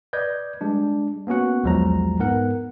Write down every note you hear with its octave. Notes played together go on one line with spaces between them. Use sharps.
B4 D5 D#5 G6 G#6
G3 G#3 D4
A#3 B3 C#4 F#4 F#5
B1 E2 F3 F#3 G#3 A#5
G#2 B3 A#4 F#5